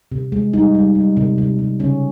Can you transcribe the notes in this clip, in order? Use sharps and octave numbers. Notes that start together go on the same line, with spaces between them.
C3
G#3
G3 D#4
G3
G3
C3
C3
C3
C#3 C#4